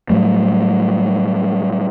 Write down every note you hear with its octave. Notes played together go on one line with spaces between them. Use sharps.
A2 F#3 G3 A3